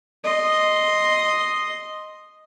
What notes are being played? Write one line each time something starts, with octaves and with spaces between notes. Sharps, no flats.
D#5 C6